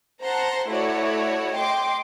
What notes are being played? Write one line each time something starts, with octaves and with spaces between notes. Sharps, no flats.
C5 F#5 A5 A#5 C6
A3 E4 F#4 C#5 D5
D#5 G5 C6 D6